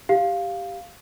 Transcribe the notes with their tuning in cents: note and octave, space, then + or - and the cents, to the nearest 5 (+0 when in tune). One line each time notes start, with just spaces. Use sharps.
G4 +0 F5 +0